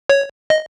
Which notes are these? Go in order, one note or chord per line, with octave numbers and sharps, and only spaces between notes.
C#5
D#5